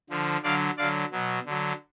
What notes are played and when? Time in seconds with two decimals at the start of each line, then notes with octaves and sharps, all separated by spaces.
0.10 D3 F3
0.43 D3 F#3 D5 F5
0.77 D3 F#3 D5 F5
1.12 B2 F#3
1.46 D3 F#3